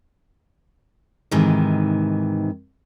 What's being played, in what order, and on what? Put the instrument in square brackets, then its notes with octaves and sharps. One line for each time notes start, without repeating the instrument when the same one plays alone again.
[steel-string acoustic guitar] G#2 C3 D#3 E3